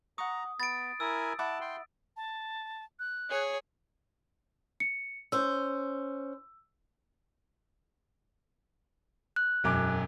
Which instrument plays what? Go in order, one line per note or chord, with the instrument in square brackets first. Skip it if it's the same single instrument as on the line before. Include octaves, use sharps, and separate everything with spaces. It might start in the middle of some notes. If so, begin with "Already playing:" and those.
[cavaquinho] F#5 C#6 [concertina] A#5 [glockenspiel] D#6
[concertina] B3 [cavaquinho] B5 [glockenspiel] A6 D7
[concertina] E4 A#4 G#5 [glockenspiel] E6
[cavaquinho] E4 F#5 D6 [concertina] A5
[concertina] G5 C6
[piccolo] A5
F#6
[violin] G#4 C#5
[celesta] C#7
[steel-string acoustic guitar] C#4 C5 [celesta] E6
[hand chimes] F#6
[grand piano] E1 F#2 D6